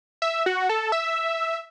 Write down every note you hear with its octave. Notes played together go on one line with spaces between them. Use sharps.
E5
F#4
A4
E5